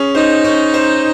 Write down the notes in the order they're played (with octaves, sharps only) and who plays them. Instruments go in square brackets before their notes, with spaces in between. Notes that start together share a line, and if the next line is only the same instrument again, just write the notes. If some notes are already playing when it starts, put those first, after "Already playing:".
Already playing: [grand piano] C#4 G#4
[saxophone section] D#4 [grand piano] C5
[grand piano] C#4
C5